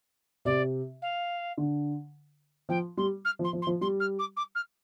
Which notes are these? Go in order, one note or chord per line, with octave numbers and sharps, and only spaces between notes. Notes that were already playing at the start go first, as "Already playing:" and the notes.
C3 D5
F5
D3
F3 G5
G3 C6
F6
F3
C6
F3
C6
F3
G3 C6
F6
D6
D6
F6